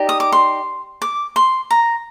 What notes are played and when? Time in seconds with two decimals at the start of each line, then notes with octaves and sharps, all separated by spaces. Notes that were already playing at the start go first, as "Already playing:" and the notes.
Already playing: D#4 G4 D5
0.09 D#6
0.20 D6
0.32 C6
1.02 D6
1.36 C6
1.71 A#5